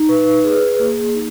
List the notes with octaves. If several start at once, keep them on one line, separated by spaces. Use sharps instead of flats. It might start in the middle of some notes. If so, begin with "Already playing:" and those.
Already playing: D#4
B4
G#4
A#3
D#4